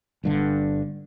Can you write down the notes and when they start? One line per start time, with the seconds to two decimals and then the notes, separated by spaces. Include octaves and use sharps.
0.23 G1 G2 D3